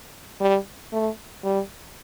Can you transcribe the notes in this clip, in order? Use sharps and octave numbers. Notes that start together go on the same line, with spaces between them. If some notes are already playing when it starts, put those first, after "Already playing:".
G3
A3
G3